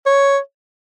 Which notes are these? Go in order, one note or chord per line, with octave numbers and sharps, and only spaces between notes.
C#5